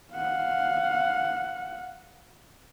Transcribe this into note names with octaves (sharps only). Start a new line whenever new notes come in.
F5 F#5